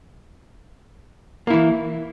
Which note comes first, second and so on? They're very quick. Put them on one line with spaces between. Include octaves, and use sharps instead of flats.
A#3 E4 E3